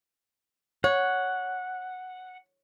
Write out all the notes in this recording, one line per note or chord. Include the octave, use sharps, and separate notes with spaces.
C#5 F#5